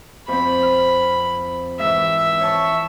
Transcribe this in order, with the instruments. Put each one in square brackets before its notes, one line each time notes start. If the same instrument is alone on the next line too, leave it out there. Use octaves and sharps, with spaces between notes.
[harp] F2 C4 [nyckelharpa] B5
[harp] F6
[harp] G#2 E3 [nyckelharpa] E5
[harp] C#5 A5 C#6